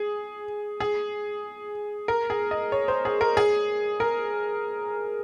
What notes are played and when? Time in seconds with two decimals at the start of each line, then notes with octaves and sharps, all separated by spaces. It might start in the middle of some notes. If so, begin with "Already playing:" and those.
Already playing: G#4
0.80 G#4
2.08 A#4
2.30 G#4
2.51 D#5
2.72 C#5
2.88 C5
3.05 G#4
3.21 A#4
3.37 G#4
4.00 A#4